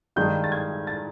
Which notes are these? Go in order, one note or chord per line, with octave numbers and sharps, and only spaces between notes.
G2 D#3 G#3 G6
A6
G#6
A6